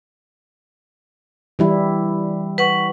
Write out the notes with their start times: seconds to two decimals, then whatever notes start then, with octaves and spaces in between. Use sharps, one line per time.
1.59 E3 G3 E4
2.58 B4 F#5 C#6